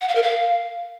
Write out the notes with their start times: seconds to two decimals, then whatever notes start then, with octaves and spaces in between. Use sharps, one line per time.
0.01 F#5
0.08 F5
0.15 A#4
0.23 F5